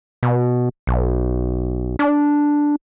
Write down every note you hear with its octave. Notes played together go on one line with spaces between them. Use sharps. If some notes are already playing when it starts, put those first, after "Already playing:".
B2
B1
D4